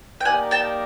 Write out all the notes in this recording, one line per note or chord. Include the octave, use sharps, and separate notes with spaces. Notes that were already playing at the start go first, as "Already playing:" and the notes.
G5
A#3 D#4 G4 A#4 D5 F#5 G#5
G5 A5